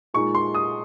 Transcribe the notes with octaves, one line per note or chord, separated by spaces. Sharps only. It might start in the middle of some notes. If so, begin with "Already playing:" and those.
A#2 G#3 D#4 C#6
C6
D#6